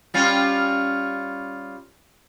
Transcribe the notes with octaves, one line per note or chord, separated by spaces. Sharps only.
G3 C#4 F4